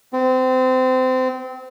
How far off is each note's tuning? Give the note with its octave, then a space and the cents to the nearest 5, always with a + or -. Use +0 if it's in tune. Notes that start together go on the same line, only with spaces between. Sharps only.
C4 -25